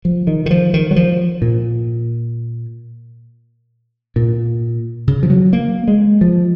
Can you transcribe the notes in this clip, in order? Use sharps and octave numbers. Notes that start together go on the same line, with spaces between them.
F3
D#3
D#3
F3
D#3
F#3
F3
A#2
A#2
C#3
F3
F#3
A#3
G#3
F3